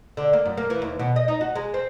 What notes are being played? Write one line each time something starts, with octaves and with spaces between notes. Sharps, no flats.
D3
A#3
F#2
A#3
E3
D#2
B2
D#5
D#4
F#4
G#3
C4